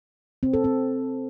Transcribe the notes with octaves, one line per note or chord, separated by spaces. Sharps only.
C4
A4
C4